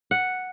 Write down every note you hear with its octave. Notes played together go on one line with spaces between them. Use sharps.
F#5